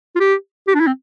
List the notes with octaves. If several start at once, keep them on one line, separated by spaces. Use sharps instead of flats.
F4
G4
G4
D4
E4
C4